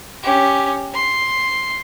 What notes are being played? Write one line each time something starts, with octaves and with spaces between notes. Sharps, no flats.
C#4 G4
C6